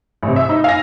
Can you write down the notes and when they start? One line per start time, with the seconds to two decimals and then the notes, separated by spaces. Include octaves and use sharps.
0.23 A1 C3
0.36 E5 E6
0.49 D#4
0.64 F5 G#5 A#6